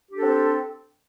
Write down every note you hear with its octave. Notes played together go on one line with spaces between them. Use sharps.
C4 D4 G4 A4